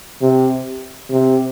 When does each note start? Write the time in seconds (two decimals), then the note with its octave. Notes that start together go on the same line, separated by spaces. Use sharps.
0.22 C3
1.10 C3